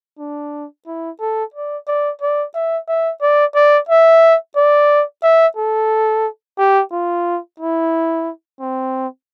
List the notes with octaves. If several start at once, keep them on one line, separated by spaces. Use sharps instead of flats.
D4
E4
A4
D5
D5
D5
E5
E5
D5
D5
E5
D5
E5
A4
G4
F4
E4
C4